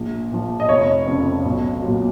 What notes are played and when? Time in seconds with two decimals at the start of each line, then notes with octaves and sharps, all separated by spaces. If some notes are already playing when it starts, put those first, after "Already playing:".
Already playing: A#1
0.31 A#2 F3
0.60 D#5
0.69 F1 C#5
1.07 F2 C#3
1.44 B1
1.82 A#2 F#3